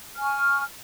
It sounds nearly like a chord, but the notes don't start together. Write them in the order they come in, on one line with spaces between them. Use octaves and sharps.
F6 G#5 C#6